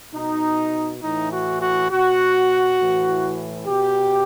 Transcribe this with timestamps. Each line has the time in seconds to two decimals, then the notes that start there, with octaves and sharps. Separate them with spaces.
0.14 B2 D#4
1.02 A2 E3 D#4
1.31 F#4
1.61 F#4
1.90 B2 F#4
2.78 A2 E3
3.66 B2 G4